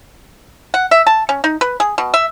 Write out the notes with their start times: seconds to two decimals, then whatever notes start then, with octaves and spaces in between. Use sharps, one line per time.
0.74 F#5
0.91 E5
1.07 A5
1.29 C#4
1.44 D#4
1.61 B4
1.80 G#4
1.98 B2
2.14 E5